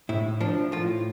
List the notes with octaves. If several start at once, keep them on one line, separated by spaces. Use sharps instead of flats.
A2 E4
F3 D4
A2 F4